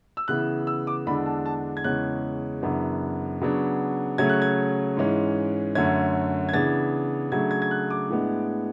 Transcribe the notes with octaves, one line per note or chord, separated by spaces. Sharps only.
E6
C#3 E3 B3 F#6
E6
D6
E2 D3 G#3 D4 B5
A5
A5
G#6
E2 C#3 G#3 C#4 F#6
F#2 C#3 E3 B3 D4
C#3 F#3 B3 D4
C#3 F#3 A3 C#4 G#6
F#6
G#6
G#2 E3 G#3 C#4
F#2 D3 A3 C#4 G#6
G#6
C#3 E3 B3 D4 A6
C#3 F#3 A3 D4 G#6
G#6
G#6
F#6
D6
A2 G#3 B3 D4